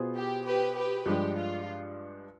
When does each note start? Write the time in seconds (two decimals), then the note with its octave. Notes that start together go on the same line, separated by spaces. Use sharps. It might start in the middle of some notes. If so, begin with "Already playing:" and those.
Already playing: B2 B3 F4 G#4 C5
0.16 G4
0.45 G4 B4
0.75 G4 B4
1.05 G2 F3 G#3 D4 G4
1.35 F4